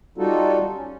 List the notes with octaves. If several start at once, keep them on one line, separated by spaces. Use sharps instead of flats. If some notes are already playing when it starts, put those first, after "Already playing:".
G3 D#4 F4 F#4 A4
C#4